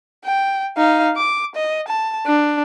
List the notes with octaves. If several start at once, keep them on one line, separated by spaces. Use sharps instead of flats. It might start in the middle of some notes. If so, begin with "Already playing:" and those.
G5
D#4 F5
D6
D#5
A5
D4